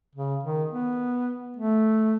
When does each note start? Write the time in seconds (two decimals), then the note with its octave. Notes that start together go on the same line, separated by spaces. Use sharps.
0.15 C#3
0.43 D#3
0.72 B3
1.57 A3